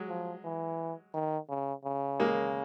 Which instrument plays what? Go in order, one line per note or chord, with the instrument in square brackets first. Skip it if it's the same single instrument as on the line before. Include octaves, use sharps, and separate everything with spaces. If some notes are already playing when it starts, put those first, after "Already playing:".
Already playing: [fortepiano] F#3 G#3
[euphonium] F3
E3
D#3
C#3
C#3
[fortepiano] G#3 A#3